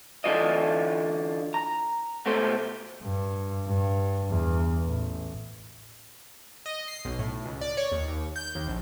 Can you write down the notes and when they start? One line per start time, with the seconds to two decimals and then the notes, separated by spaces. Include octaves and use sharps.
0.24 D3 E3 F4 D5 D#5
1.54 A#5
2.26 B2 A3 G4 C5
3.02 G2
3.66 G2
4.29 E2
4.85 A1
6.66 D#5
6.88 C7
7.05 B1
7.19 A2
7.45 C#2
7.61 D5
7.77 C#5
7.92 D#2
8.08 D#2
8.36 G6
8.55 D#2
8.68 A#1